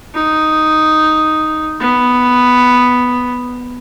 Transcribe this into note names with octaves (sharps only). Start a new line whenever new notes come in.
D#4
B3